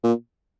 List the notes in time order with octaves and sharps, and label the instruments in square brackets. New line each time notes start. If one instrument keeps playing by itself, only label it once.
[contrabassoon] A#2